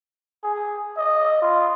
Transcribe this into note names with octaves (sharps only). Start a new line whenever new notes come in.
G#4
D#5
F4